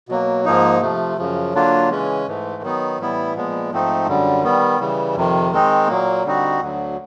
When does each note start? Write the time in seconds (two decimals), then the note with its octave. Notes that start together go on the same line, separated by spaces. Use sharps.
0.09 B2 F#3 A#3
0.45 G#2 F3 A#3 D#4
0.81 C3 F3 A3
1.18 F#2 C#3 F3
1.54 D3 F#3 A#3 D4 F4
1.90 C#3 E3 G#3 C#4
2.27 G#2 E3 A3
2.62 D#3 F#3 B3 D#4
2.99 A2 E3 G3 B3 E4
3.35 A#2 F3 G#3 B3
3.72 G#2 F3 A3 C4 D#4
4.07 F#2 D3 G3
4.43 D#3 G3 B3
4.80 C#3 E3 G3
5.16 F2 C3 D#3
5.52 D#3 G#3 C4 D#4
5.88 A#2 F#3 A#3
6.25 D3 G3 C4 D#4 F#4
6.61 D2 D3 F#3